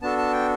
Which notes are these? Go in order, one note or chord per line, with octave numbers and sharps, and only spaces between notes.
B3 D4 F#4 A4 A5
A5
G5